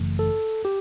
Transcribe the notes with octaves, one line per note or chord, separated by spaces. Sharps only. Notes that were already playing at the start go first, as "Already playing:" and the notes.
Already playing: G1 F#2 C#3 E3 A3
A4
G4